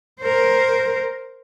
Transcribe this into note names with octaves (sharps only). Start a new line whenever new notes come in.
A#4 C5